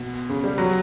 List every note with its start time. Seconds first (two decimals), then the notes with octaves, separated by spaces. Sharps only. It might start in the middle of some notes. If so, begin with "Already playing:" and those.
Already playing: B2
0.29 C#3
0.44 G3
0.58 F#3